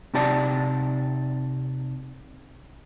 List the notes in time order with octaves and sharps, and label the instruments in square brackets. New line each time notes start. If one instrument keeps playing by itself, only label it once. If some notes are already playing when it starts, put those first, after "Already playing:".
[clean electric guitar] C3 D#4 G4 D5 A5